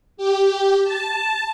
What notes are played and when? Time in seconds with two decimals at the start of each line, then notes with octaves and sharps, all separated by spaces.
0.17 G4
0.84 A5